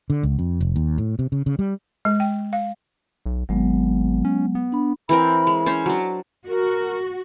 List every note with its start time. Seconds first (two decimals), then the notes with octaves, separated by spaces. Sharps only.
0.10 D3
0.23 C#2
0.39 F2
0.61 F1
0.76 D#2
0.98 A2
1.19 C3
1.32 C#3
1.46 C#3
1.59 G3
2.05 G#3
2.20 G5
2.53 F5
3.26 B1
3.49 G#1 F#3 G#3 B3
4.25 C#4
4.55 B3
4.72 D4 B5
5.09 E3 C4 A#4 B5
5.47 G#3
5.66 C#4 C5
5.86 F#3 D4
6.48 F#4 A#4